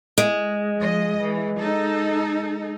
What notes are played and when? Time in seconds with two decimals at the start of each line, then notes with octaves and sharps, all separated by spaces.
0.18 G#3
0.76 F3 D#5
1.19 E3
1.58 D#4 A4